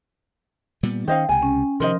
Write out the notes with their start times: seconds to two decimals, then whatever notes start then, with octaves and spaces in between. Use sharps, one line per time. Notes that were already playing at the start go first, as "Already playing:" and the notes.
0.83 A#2 G3 B3
1.08 D#3 C#4 C5 D#5 F5 G5
1.29 C#2 C3 G#5
1.42 C#4
1.80 C3 D#3 F3 A#4 C5 D#5 C6